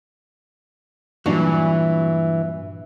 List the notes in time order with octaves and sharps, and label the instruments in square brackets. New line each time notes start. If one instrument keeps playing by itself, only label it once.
[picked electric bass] G2 A#2 D4 [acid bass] E3 [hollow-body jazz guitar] F#3